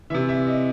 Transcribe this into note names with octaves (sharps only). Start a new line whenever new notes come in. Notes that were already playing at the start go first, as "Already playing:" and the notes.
C3 E3 E5
E5
D#5